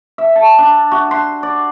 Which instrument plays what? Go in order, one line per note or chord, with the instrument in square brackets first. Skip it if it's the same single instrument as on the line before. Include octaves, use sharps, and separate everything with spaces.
[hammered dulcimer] E5
A5
D4
F#4
C6
D5